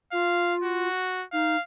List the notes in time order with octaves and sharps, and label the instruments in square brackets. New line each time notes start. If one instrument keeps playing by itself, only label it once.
[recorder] F4 [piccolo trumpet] F5
[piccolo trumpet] F#4
[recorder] D#4 [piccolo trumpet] F5